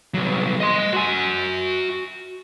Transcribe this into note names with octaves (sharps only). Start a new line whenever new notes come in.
C2 F#3
D#5 C6
F#4 G#5